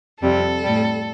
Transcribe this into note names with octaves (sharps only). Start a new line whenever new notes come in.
F2 C3 G3 A4
G3
A2